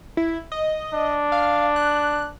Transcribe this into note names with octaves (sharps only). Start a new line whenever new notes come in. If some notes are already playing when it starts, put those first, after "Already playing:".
E4
D#5
D4
F5
F#6